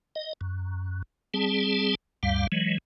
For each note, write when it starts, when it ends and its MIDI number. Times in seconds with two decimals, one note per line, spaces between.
0.16 0.33 75
0.41 1.02 42
1.34 1.95 55
1.34 1.95 60
1.34 1.95 68
1.34 1.95 81
2.23 2.47 38
2.23 2.47 43
2.23 2.47 55
2.23 2.47 77
2.52 2.78 52
2.52 2.78 54
2.52 2.78 56